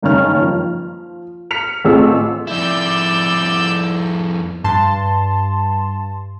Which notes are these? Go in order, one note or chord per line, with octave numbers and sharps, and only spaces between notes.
F#1 G2 D#3 C#4 F6
F3
F6 B6 C#7 F7
A1 A3 C4 F4 G#4 E6
F2 E4 D5 E6 G6
G2 A5 C6